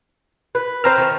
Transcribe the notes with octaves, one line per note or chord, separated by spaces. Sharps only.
B4
C4 B4 C5 A#5 F6
D#3 F3 A3